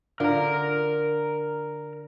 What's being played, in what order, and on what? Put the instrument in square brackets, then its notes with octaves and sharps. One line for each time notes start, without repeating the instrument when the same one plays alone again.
[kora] D3 F4 [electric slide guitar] A#4 A#5